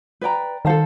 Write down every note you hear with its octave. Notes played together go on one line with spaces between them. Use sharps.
B4 D5 G5 A#5
D#3 A4 C5 F5 A5